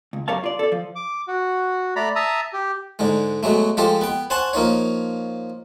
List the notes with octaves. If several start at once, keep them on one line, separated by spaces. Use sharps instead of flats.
C#2
F#2 G4 A#4 C#5 F5 A5
F4 D5
A4 D5
F3
D6
F#4
A3 D5 A#5 B5
E5 A5 A#5 D#6 E6
G4
G#2 D3 G#3
B2 F#3 G#3 A3
F3 G#3 G4 A4 C5
B3 G5
C5 F#5 G#5 A5 C6 C#6
F3 A#3 D#4 C#5